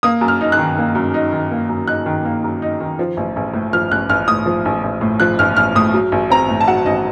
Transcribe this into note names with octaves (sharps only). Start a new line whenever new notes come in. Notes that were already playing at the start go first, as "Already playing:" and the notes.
A#3 D#6
F#2
F6
D#4
F#6
D#3
A#3
F#2
D#4
D#3
A#3
F#2
D#4 F#6
D#3
A#3
F#2
D#4
D#3
F3
A1
A1
A2
F3 F6
A1 F#6
A1 F6
A2 D#6
F3
A1
A1
A2
F3 F#6
A1 F6
A1 F6
A2 D#6
F#3
A1
C4 A#5
A2
A5
F#3 F#5
A1 D#5